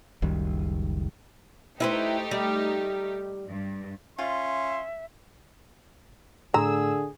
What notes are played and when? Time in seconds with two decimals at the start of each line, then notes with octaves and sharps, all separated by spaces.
0.22 F#1 C#2 D#3 G3
1.80 A3 D#4 E4 G4 B4 C5
2.31 G3
3.47 G2
4.18 C#4 F4 E5 C6
6.54 A2 D3 G#4 A#5 E6